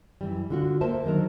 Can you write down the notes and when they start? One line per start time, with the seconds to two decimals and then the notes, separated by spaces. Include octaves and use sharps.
0.21 F#2 E3 G3
0.50 D3 F4 F#4
0.81 A#3 A#4 C5 E5 A5
1.04 D3 D#3 F#3 A#4